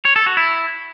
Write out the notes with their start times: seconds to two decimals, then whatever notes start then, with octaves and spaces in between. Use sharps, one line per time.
0.05 C#5
0.16 A4
0.26 F#4
0.37 E4